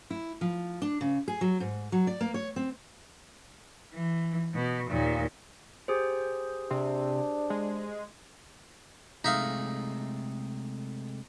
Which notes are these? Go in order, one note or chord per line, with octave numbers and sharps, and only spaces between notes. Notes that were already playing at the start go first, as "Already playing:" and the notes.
E4
F3
D4
C#3
G#4
F#3
G#2
F#3
D5
A#3
C#5
C4
E3
B2
D#2 A#2
G4 G#4 C5
C3 D4
G#3
C3 G#3 A3 D#4 E5 F5